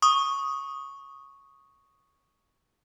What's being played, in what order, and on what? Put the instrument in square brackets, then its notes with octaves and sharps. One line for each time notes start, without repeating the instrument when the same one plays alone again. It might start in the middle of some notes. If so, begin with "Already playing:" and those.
[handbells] C#6 D#6